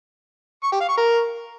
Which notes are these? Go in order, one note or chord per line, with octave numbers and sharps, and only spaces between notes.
C#6
G4
F5
C#6
A#4